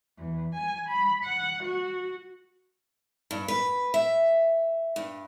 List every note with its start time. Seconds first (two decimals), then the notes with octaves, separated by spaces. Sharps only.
0.17 E2
0.56 G#5
0.89 B5
1.24 F#5
1.64 F#4
3.31 G2
3.48 B4
3.94 E5
4.96 G2